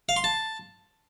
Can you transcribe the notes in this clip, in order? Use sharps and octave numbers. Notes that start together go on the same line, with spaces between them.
F5
C6
A5